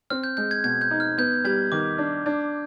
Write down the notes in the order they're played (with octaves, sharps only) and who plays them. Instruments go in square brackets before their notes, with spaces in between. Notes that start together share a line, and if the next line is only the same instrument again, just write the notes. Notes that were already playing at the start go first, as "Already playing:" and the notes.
[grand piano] C4 [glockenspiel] F6
[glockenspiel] G6
[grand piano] G#3 [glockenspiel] G6
[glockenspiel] G#6
[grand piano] B2 [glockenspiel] G#6
[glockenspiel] G6
[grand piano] D#4
[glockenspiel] F6
[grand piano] B3 [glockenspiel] G6
[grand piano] G3 [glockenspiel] G#6
[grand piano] D#3 [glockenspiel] D6
[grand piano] D4
D4